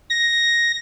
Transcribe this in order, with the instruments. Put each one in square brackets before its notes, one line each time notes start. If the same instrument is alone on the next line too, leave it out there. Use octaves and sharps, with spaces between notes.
[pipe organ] A#6